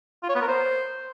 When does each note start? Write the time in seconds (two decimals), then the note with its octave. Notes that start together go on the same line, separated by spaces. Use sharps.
0.23 F4
0.29 C#5
0.35 B3
0.42 A#4
0.48 C5